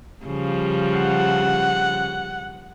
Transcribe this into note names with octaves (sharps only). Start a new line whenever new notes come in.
C#3 F3 G3
F#5